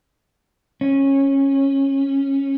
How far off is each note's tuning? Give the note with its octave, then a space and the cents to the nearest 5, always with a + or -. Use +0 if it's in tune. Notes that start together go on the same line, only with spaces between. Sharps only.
C#4 -15